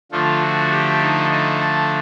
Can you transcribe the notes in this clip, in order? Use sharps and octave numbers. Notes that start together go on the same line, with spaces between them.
D3 F3 A3 F4
F#4
G4
D#4
D#4
A4